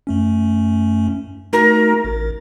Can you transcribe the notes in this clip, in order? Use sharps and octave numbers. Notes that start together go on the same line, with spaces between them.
F#2 A3 C#4
A3 D#4 F#4 A#4
A1